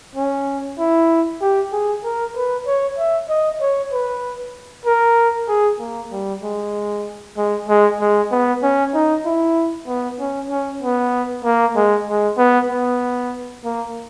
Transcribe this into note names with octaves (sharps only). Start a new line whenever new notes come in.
C#4
E4
G4
G#4
A#4
B4
C#5
E5
D#5
C#5
B4
A#4
G#4
A#3
G3
G#3
G#3
G#3
G#3
B3
C#4
D#4
E4
B3
C#4
C#4
B3
A#3
G#3
G#3
B3
B3
A#3